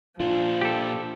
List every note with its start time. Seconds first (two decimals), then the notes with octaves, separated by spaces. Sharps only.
0.20 A#2 F3 D4 F4
0.61 G4 A4